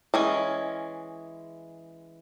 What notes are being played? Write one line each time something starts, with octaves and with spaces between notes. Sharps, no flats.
E3 G#3 C#4